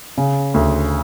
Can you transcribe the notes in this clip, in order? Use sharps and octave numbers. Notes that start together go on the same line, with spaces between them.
C#3
D2